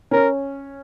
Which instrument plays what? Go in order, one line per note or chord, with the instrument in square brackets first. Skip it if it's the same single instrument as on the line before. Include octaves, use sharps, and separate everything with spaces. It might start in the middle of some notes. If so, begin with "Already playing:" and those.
[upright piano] C#4 [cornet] A#4